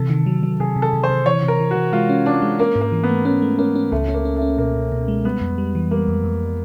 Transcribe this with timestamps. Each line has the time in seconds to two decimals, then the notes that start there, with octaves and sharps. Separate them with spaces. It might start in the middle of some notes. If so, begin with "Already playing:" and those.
Already playing: C3 E3 A4
0.10 D#3
0.26 F#3
0.43 F#3
0.60 C3 G#4
0.76 C3
0.82 A4
0.93 C3
1.04 C5
1.10 C3
1.26 E3 C#5
1.43 C3
1.48 A#4
1.59 E3
1.71 E3 F#4
1.93 G#3 F4
2.09 C#4
2.26 C#4 D4
2.42 G#3
2.59 A#3 C#4
2.76 G#2
2.81 A#3
2.92 E3
3.04 B3
3.09 A3
3.25 B3 C#4
3.42 A3
3.58 A#3 C#4
3.75 C#4
3.92 C#2 A3
4.08 C#4
4.14 A#3
4.25 C#4
4.36 A3
4.42 C#4
4.58 B2 A#3
4.75 B2
4.92 B2
5.08 G#3
5.25 G3 B3
5.41 F2
5.58 G3
5.75 E3
5.91 G3 A#3
6.08 F2
6.24 F2